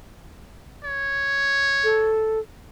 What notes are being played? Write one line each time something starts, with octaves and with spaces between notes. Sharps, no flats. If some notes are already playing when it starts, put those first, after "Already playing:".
C#5
A4